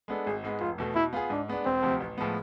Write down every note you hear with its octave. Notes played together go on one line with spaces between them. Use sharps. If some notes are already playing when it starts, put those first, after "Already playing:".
G#3 B3 D4 A4
G#1 G#4
G#2 G#3 B3
F1 F4
E2 B2 A3
B2 E4
B3 F4 G#4
G#2 D4
G#3 B3 D4
E1 C4
D2 C3 F3
A1
A2 F3 G#3 B3